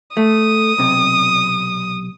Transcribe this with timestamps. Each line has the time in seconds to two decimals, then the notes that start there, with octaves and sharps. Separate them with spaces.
0.17 A3 D#6
0.78 B1 C3